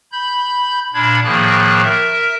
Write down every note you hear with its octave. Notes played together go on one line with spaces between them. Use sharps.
B5 G6
A#2 D4 B5 G#6
A2 D#3 F3 A#3 G#4 F#6
A#4 E5